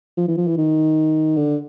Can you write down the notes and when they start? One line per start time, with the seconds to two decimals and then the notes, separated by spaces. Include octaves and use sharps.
0.17 F3
0.28 E3
0.37 F3
0.47 E3
0.58 D#3
1.37 D3